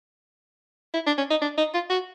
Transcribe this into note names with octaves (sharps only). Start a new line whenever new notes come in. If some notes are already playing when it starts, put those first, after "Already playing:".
E4
D4
C#4
D#4
D4
D#4
F4
F#4